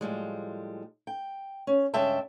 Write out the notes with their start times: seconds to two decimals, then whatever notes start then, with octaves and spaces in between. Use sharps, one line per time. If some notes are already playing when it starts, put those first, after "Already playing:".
0.01 A2 F3 G3 G#3
1.07 G5
1.67 C#4
1.94 G2 C#3 G#3 E5 G5 A5